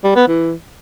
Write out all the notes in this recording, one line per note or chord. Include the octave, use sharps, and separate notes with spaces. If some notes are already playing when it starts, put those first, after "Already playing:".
G3
B3
E3